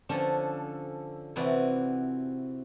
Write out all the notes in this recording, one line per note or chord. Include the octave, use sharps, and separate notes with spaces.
D3 F3 C#4 D4 A4
C3 E3 F#4 D5 B5